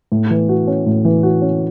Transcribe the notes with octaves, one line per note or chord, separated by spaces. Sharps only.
A2
E3
F#4
C#4
A2
E3
F#4
C#4